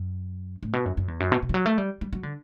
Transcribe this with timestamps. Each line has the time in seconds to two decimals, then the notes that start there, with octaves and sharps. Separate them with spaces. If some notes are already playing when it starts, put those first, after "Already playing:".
Already playing: F#2
0.63 A2
0.73 B2
0.86 F#2
0.97 F#2
1.08 E2
1.20 F#2
1.32 B2
1.43 B2
1.49 E3
1.54 F#3
1.66 A3
1.78 G3
2.01 G3
2.13 F#3
2.23 D3